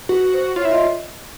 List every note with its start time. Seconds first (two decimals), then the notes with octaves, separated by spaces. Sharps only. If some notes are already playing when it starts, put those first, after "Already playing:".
0.09 F#4 B4
0.33 C5
0.56 F4 C#5
0.64 E4 E5
0.71 F4 D#5